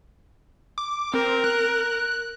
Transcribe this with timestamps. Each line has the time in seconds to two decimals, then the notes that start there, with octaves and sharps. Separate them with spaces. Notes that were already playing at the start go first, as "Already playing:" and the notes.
0.78 D6
1.14 C4 A#4
1.44 F#6